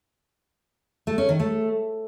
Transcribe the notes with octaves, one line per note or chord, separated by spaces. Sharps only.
A3
C#4
D#3
A3